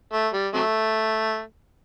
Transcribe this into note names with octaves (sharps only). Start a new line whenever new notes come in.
A3
G3
C3 F#3 A3